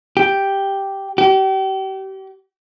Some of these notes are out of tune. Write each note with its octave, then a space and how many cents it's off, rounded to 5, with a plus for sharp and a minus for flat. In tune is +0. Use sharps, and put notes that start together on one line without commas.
G4 +0
G4 -35